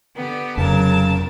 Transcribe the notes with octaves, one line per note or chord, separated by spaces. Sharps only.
D3 B3 G4
F1 F2 C#3 F#3 B3 A#4 A5